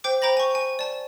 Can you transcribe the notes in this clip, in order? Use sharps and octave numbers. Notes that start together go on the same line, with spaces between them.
C5 G5 D6
C5 G5 A#5 B5 A#6
G#5 C#6
G#5
D5 A5